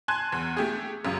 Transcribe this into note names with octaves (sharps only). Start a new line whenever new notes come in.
G#5 A5 C6 F#6 G#6
E2
A3 G4 G#4
B1 F#2 C#3